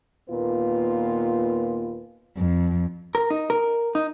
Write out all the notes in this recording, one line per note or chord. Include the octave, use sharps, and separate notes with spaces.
D#2 A#2 B3 F4 B4
F2
A#4
D#4
A#4
D#4